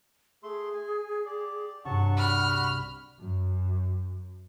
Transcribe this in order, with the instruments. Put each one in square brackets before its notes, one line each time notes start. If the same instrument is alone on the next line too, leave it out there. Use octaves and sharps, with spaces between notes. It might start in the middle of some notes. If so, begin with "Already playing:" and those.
[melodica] A3 C6 [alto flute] G#4
[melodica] G#5
G4 D5
[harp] C2 G2 [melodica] F#3 A5 C#6 [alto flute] F#5
[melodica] G3 F#4 [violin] B5 F6
[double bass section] F#2